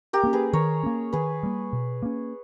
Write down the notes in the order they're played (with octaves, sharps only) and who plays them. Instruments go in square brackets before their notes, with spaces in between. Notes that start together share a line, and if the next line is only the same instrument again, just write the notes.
[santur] G4 A#4
[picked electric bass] A#3 C#4
[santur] G#4 B4
[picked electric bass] D#3 [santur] A#4 C#5
[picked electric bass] A#3 C#4
[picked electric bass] D#3 [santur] G#4 B4
[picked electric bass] G3 A#3
B2
A#3 C#4